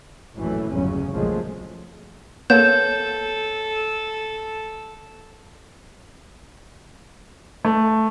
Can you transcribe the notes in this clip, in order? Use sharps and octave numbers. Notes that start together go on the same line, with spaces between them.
A#1 F#2 A2 E3 F#3 A3
G1 E2 C#3 F#3 C#4
F1 A#1 F3 F#3 G#3 A3
A#3 B3 A4 C#5 G6 E7
A3